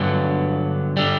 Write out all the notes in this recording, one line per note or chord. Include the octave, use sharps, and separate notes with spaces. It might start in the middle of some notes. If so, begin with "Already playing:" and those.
Already playing: G2 D3 F#3 B3
D3 G3